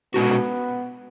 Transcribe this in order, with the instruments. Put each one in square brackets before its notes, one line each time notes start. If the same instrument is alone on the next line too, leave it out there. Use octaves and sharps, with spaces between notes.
[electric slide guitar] B2 G#3 C#4 F#4 [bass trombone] B3